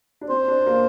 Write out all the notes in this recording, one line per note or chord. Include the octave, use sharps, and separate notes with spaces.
D4
C4 C5
D4
A#3